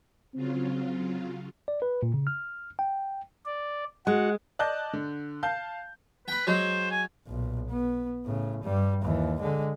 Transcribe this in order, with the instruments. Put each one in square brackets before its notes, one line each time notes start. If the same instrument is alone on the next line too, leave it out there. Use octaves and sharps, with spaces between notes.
[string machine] C#3 F#3 F4 [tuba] C4
[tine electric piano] D5
B4
A#2
C#3
F6
G5
[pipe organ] D5
[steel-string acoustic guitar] G#3 [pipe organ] F#4 F#5
[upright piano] D5 D#5 A5 F#6 G6
D3
F5 A5 G6
[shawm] B4 [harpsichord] G5 B5
[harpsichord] F#3 G#3 [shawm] C5
[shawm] G#5
[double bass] B1 A#2
B3
A2 C#3
G2 G3
D#2 E3
D3 G#3